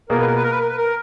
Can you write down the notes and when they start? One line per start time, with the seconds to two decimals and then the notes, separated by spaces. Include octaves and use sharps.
0.09 B2 A#3 F4 G#4 A#4
0.18 B4
0.26 A#4
0.34 B4
0.43 A#4
0.51 B4
0.59 A#4
0.68 B4
0.77 A#4